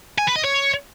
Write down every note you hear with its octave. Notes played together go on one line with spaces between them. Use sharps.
G#5
B4
D#5
C#5